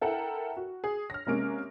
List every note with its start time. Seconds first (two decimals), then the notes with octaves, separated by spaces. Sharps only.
0.01 E4 A4 A#4 F#5 G5
0.57 F#4
0.84 G#4
1.10 F6 A#6
1.26 C3 G#3 A#3 C#4 D7